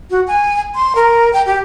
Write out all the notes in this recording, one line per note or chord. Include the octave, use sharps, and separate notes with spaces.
F#4
G#5
C6
A#4
G5
G4